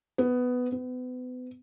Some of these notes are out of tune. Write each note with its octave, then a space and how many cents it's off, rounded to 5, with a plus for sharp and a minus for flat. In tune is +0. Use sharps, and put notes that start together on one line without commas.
B3 +10
B3 +35